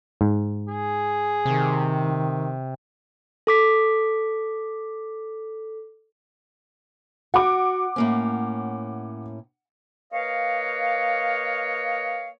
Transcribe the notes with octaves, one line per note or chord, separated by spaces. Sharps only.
G#2
G#4
C3 D#3
A4 D6 B6
F#4 F#5 D6
A2 A#3 C#4
A#3 B4 C#5 D#5 F5